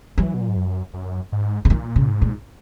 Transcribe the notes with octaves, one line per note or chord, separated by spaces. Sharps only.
E3 F#3
B2
A#2
G#2
F#2
F#2
G#2
C#3
A#2 D#3
C#3
A#2
G#2
A#2